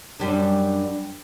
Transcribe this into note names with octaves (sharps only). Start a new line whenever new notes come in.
F#2 G3 D4